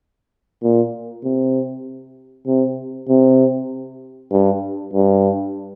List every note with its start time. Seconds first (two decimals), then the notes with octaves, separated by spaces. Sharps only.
0.63 A#2
1.24 C3
2.47 C3
3.09 C3
4.32 G2
4.93 G2